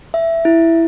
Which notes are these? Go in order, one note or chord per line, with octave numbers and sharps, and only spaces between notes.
E5
E4